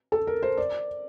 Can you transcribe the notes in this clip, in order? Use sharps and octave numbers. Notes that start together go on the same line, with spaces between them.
A4
A#4
C5
D5